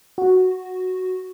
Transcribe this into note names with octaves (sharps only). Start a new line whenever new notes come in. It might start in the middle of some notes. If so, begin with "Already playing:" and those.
F#4